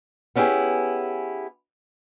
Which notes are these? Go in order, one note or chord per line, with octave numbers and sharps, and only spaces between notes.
B3 C#4 D4 E4 G4 G#4